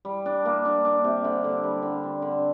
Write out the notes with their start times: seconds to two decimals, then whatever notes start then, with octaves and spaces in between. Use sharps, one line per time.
0.05 G3
0.26 D4
0.45 A#3
0.65 D4
0.85 D4
1.04 C3
1.24 D3
1.44 D3
1.64 G3
1.82 D3
2.03 C4
2.22 D3